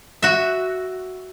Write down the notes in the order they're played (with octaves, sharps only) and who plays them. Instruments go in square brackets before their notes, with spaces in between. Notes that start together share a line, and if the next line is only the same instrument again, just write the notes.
[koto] F#4 E5